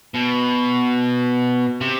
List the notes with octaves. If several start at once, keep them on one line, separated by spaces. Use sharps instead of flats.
B2
C3